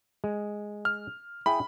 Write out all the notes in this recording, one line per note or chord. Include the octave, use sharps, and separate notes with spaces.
G#3
F6
E4 G#4 G5 B5